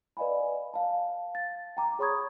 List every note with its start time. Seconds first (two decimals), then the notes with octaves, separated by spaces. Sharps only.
0.17 B4 D5 D#5 F5 G#5 B5
0.74 F5 A5
1.35 A6
1.77 G5 A#5 D6
1.99 G#4 C#5 B5 C#6 D#6 G#6